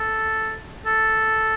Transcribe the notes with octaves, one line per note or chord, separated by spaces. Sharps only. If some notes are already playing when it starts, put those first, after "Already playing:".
Already playing: A4
A4